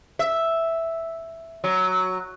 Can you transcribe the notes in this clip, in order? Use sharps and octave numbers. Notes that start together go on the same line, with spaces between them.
E5
F#3